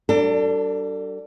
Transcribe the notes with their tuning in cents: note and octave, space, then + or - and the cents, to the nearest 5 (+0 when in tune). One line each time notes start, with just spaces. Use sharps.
G3 -40 D4 +0 A4 +40